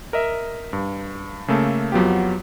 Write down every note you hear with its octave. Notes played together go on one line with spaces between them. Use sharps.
A#4 D#5 E5
G2
C#3 A3 A#3 A4
F2 F#3 B3 F4 G4